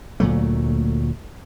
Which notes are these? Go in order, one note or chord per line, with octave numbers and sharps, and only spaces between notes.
D2 A#2 F#3 A3